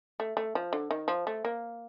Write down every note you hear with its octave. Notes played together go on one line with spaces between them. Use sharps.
A3
A3
F3
D3
D#3
F3
A3
A#3